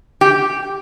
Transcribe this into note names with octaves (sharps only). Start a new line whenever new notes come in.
G4